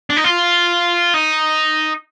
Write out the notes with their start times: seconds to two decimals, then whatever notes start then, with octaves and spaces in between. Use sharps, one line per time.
0.10 D4
0.17 D#4
0.24 F4
1.14 D#4